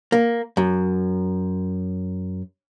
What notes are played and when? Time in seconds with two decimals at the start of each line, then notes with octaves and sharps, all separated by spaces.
0.12 A#3
0.57 F#2